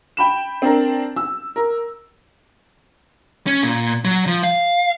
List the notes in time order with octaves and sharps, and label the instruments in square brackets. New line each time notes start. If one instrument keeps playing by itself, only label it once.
[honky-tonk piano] G5 B5 E7
C4 D4 A#4
E6
A#4
[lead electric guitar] C#4
A#2
F#3
F3
F5